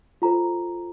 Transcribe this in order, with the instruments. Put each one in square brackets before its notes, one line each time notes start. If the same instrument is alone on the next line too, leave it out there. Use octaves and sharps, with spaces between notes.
[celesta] F4 A4 C5 A#5